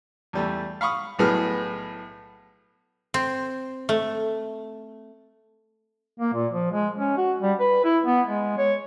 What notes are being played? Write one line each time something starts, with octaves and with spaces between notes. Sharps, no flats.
E2 G3 A3
F5 B5 C#6 D#6
B1 A2 B3 G#4 F6
C4
A3
A#3
A#2
F3
G#3
C#4
F#4
G3
B4
E4
B3
G#3
C#5